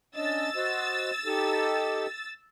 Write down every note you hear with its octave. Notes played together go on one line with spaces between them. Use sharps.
C#4 D4 D#5 E6 A6
F#4 C5 D#5
D#4 G4 A4